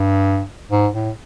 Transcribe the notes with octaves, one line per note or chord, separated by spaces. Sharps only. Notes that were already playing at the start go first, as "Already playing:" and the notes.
Already playing: G2
G#2
A2